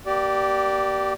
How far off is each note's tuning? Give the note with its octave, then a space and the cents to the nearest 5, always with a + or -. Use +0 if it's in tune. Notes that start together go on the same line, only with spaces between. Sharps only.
A#3 +20 G4 -20 D5 +0